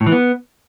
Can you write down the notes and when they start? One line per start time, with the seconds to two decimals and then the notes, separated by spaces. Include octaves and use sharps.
0.01 A2
0.06 E3
0.12 B3